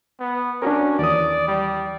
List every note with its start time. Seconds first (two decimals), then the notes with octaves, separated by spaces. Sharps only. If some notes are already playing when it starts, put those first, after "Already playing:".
0.20 B3
0.62 C#4 D4 F#4 A#4
0.99 D#2 E3 D5 D#6
1.48 G3